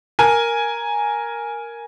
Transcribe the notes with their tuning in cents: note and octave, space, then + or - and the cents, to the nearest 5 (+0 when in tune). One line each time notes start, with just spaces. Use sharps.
A#4 +0 G#5 +0